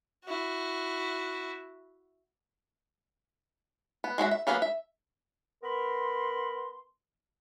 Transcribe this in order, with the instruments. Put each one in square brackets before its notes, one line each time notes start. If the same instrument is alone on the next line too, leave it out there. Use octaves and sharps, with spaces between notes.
[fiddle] E4 F#4
[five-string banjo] B3
G#3 F#4 A4 E5
E5
F#3 A#3 B3 G#4 A#5
E5
[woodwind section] B3 A#4 B5 C6